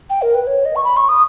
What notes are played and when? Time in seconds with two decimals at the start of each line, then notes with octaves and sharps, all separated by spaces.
0.10 G5
0.22 A#4
0.35 B4
0.47 C#5
0.65 D#5
0.76 C#6
0.84 B5
0.97 C#6
1.09 D#6